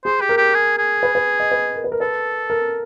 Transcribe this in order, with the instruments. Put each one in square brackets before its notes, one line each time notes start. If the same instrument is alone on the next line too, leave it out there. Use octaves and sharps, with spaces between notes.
[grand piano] G#4 [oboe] C5
[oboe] G4
[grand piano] A#4
[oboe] G4
G#4
G#4
[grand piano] B4
B4
D#5
B4
A#4
B4
A#4
[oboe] A4 [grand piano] B4
[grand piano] A#4